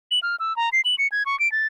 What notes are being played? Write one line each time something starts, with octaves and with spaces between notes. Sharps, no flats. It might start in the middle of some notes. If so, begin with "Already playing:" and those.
F#7
F6
E6
A#5
C7
F#7
C#7
G#6
C#6
D7
A6